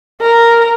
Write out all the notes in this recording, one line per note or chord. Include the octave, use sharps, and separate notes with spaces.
A#4